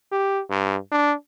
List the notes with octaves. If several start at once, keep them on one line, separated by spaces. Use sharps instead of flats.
G4
G2
D4